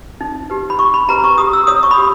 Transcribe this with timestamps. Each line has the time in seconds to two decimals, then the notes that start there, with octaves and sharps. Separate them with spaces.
0.21 D#4
0.50 G4 B4
0.70 B5
0.79 D#4 C#6
0.94 B5
1.08 G4 B4 A#5
1.24 C#6
1.38 G4 D#6
1.53 E6
1.67 C#5 D#6
1.83 C#6
1.91 B5
1.98 G4